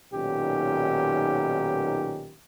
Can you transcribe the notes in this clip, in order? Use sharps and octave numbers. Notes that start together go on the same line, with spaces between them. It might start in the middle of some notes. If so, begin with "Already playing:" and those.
B1 A#2 D#3 C#4 G4